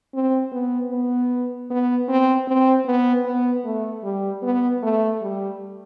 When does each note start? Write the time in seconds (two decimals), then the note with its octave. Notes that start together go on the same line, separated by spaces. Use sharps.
0.14 C4
0.52 B3
0.91 B3
1.70 B3
2.08 C4
2.47 C4
2.86 B3
3.25 B3
3.65 A3
4.03 G3
4.42 B3
4.82 A3
5.21 G3